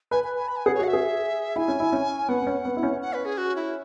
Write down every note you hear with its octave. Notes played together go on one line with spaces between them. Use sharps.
B4 G#5
G#5
G#5
B5
G#5
G#4 F#5
C#5
F#4 F#5
E5
G#4
E4 G#5
C#4
E4
C#4
B3 F#5
B3
C#4
B3
E4
C#4
F#5
B4
G#4
F#4
E4